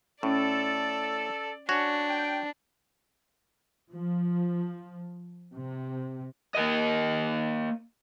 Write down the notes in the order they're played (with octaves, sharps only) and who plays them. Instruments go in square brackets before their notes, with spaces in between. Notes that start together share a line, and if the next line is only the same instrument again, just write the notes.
[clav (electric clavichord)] A2 [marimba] C#4 [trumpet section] A4 [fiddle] D5
[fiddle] D4 [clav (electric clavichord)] F#4 C#5 [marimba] G#5
[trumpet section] G5
[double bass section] F3
C3
[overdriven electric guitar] A#3 D#5